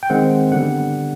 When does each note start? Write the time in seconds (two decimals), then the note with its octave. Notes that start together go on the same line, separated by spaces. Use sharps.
0.03 G5
0.10 D#3 G#3 C4 F#5
0.52 D3 G3 B3 F#5